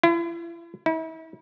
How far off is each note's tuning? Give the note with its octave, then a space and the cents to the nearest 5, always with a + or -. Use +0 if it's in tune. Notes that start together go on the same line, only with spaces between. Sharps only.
E4 +40
E4 -40